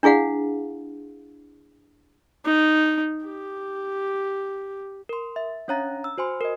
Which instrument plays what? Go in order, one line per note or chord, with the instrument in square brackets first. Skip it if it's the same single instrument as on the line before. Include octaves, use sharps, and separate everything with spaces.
[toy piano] D4 E4 G#4 F5 F#5
[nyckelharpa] D#4
G4
[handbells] A#4 C6
E5
C#4 D4 C#5 F5 A#5 A6
E6
F#4 C5 G#5 C6
A#4 D#5